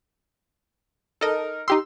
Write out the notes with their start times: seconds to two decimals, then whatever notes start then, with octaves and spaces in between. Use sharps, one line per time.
1.21 D#4 A4 A#4 D#5
1.68 D#4 G4 C6 E6